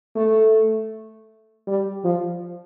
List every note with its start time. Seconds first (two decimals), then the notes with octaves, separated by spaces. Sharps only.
0.16 A3
1.67 G3
2.04 F3